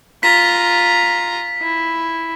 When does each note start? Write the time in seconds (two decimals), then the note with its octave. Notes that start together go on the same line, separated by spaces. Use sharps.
0.23 F4 A#5 B6
1.62 E4